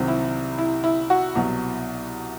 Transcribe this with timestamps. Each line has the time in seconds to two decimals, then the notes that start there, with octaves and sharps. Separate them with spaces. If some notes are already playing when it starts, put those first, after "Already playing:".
Already playing: C2 C3 D#3 F#3 C4
0.08 E4
0.58 E4
0.84 E4
1.10 F#4
1.35 C2 B2 F#3